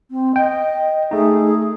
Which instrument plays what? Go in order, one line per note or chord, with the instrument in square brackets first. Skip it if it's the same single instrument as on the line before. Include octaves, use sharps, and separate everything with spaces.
[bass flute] C4
[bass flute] D#5 [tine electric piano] G5
[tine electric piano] A3 D#4 [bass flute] G#4